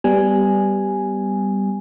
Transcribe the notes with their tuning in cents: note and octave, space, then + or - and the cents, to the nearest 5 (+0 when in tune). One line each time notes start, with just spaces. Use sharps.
G3 +0 B3 +15 G#5 +0